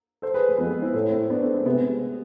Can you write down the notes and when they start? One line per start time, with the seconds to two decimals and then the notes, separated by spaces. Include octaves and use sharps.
0.22 A4 C5
0.34 G#4 B4
0.49 A3
0.58 F2 G#3 B3
0.70 G#3 B3
0.82 C4 E4
0.94 A2 A3
1.12 A3 C4
1.30 B3 D4
1.42 A3 C4
1.54 G#3 B3
1.66 C3 G#3 B3